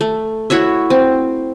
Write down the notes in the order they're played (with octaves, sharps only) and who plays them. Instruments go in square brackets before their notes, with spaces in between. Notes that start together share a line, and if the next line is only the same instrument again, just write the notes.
[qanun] A3
E4 F#4 C#5 E5
C4